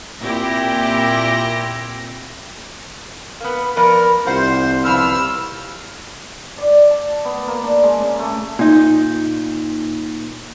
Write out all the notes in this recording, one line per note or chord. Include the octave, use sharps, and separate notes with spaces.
A#2 C4 E4 G4 A#6
A#3 B3
F3 B3 A#4 D5
C2 F4 C5 F#5
C#3 F3 B3 E6 F6
D5
A5
B3
A#3
D4
G#3
C#3
A3
A#2 D#4